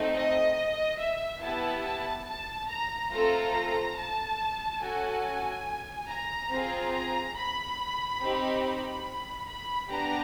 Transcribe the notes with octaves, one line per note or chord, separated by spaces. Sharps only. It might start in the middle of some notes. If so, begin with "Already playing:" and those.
Already playing: A3 C4 D#4
D#5
E5
B3 E4 G4 A5
A5
A5
A#5
A3 C4 F4 A4 A#5
A5
C#4 F#4 A4 G#5
A#5
C4 F4 G#4
A#5
B5
C4 D#4 G4
B5
B5
B3 D4 G4 A#5